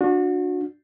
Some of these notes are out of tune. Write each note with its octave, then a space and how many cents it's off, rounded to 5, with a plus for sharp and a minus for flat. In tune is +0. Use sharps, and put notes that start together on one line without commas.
D4 +0 F#4 -30